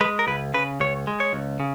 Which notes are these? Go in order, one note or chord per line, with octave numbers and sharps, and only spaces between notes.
G#3 B4
A#4
C#2 B4
C#3 B4
C#2 C#5
G#3
C#5
C#2
C#3